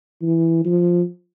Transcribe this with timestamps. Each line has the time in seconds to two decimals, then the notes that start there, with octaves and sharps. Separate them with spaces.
0.22 E3
0.65 F3